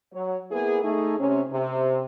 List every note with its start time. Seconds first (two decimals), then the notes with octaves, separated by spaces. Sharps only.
0.13 F#3 C#5
0.51 A#3 B3 E4 G#4
0.82 A3 D#4 G#4
1.19 C3 C#4
1.51 C3